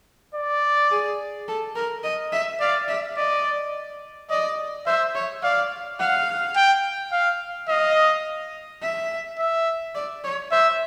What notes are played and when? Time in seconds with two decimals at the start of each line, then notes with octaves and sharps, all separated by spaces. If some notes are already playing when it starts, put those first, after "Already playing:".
0.35 D5
0.91 G#4
1.48 A4
1.76 A#4
2.04 D#5
2.32 E5
2.60 D5 F5
2.88 E5
3.17 D5 D#5
4.30 D5 D#5
4.87 C5 E5
5.15 C#5
5.43 D5 F5
6.00 F5 F#5
6.56 G5
7.12 F5
7.69 D#5 F5
8.82 E5
9.39 E5
9.95 D5
10.24 C#5
10.52 C5 E5